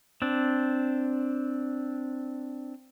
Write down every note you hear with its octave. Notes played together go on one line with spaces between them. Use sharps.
C4 D4